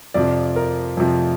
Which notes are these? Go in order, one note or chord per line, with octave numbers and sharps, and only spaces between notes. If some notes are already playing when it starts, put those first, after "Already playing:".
F2 C3 F3 D5
A#4
F2 C3 F3